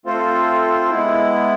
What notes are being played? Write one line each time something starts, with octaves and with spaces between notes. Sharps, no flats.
A3 C4 F4 A4 C5
G#3 B3 E4